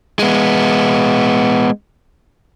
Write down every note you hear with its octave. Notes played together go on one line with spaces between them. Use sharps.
G#3 B3